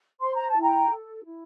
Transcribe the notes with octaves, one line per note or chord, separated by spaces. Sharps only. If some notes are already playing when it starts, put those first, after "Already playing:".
C5 C6
A#5
A5
E4
G5 A#5
A4
E4